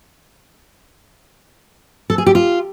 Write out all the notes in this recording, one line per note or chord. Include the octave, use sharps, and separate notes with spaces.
A4
G#4
G4
F4